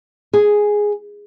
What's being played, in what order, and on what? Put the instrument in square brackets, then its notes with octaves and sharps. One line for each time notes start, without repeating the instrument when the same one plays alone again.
[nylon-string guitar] G#4